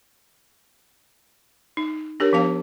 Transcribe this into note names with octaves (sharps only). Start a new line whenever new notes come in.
D#4
D4 G4 A#4 C#5
F3 B3 D4 F5 A5